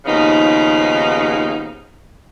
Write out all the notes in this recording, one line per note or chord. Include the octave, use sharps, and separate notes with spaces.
D#2 C#3 F3 B3 D#4